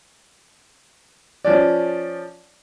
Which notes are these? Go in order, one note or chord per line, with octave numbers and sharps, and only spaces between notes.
F3 C#4 D5